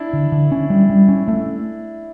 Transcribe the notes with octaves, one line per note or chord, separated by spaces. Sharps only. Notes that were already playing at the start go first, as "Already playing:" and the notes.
Already playing: D4 E4
D3
D3
C#4
G3
G3
C#4
A3